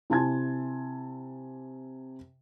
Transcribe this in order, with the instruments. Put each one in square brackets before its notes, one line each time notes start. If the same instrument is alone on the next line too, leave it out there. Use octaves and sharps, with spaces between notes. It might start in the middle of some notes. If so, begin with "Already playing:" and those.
[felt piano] C3 E4 G#5 A5 C6 G#6